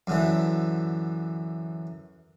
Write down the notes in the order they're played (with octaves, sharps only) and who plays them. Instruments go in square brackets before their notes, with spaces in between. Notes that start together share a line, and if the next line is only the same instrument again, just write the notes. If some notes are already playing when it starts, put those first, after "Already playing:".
[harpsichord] F#2 D3 E3